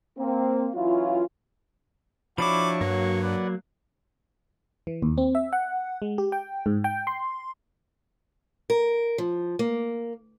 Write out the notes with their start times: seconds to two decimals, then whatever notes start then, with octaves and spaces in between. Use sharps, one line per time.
0.18 A#3 C4
0.75 E3 F#3 C#4 E4 F4
2.38 F3 D4 E4 F#4 C#5 B5 C#6 D6
2.81 G2 F#3 A#3
3.23 B4 D5 F#5
4.87 E3
5.02 D#2
5.18 C4
5.35 E5
5.53 F#5
6.02 G#3
6.18 G4
6.32 G5
6.66 G#2
6.84 G5
7.07 C6
8.70 A#4
9.18 F3
9.59 A#3